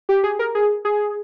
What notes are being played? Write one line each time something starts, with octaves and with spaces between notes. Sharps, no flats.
G4
G#4
A#4
G#4
G#4